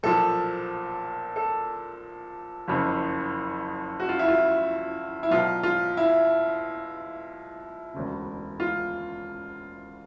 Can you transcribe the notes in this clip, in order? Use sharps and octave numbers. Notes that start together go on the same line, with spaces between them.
B1 A#2 F3 A4
A4
F#1 F2 C#3
F#4
F4
E4
F4
E4
B1 B2 F#3 F4
F4
E4
E1 D2 C#3
F4